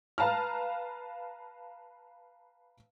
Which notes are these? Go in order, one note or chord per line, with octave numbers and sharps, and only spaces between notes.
B4 F5 A5 A#5 F6